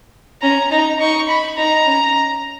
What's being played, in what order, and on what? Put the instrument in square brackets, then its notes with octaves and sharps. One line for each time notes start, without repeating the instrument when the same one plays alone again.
[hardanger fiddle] C#4 [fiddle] A#5
[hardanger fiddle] D#4 [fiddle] A#5
[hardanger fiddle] D#4 [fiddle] C#6
[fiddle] B5
[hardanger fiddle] D#4 [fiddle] A#5
[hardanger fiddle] C#4